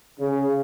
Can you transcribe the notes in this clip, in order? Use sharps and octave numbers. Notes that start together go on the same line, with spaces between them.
C#3